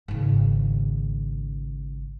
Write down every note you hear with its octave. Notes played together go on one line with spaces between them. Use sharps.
G#1 C#3